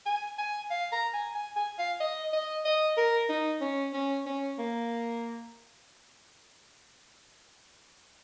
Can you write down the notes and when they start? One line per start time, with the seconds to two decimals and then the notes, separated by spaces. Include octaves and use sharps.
0.06 G#5
0.38 G#5
0.70 F5
0.92 A#5
1.13 G#5
1.34 G#5
1.56 G#5
1.79 F5
2.00 D#5
2.33 D#5
2.65 D#5
2.97 A#4
3.29 D#4
3.61 C#4
3.93 C#4
4.26 C#4
4.58 A#3